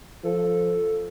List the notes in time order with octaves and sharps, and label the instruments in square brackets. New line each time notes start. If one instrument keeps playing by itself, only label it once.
[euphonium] F3 [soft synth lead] A4